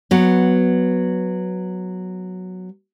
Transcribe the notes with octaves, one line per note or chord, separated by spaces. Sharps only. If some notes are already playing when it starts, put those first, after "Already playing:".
F#3 B3